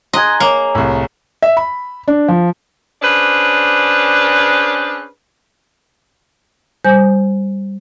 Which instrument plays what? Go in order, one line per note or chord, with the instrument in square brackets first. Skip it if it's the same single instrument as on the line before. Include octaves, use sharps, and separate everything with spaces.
[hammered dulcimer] G#4 A#5 [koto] D#5 [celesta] C6 F#6 G#6
[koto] A#3 [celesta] C#5
[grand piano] C2 A2
[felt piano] E5
B5
D4
F3
[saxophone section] C#4 D4 G#4 B4 C5 D5
[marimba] G3 C5 G#5 G6